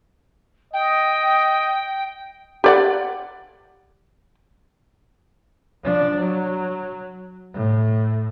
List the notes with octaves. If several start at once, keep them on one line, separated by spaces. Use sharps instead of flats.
D#5 G5
G4 D5 F#5
F3 D4
F#3
A2